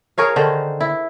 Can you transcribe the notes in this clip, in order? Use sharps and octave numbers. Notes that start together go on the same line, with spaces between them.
G#4 A#4 C#5 F5
D3 D#3 C5
E4